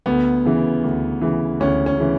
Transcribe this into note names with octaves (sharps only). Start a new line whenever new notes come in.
D2 B3
C#3 E3
D2
C#3 E3
D2 C#4
C#4
C#3 E3